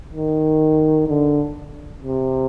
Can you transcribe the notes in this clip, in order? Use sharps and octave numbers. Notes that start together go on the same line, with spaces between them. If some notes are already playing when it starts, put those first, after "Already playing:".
D#3
D3
C3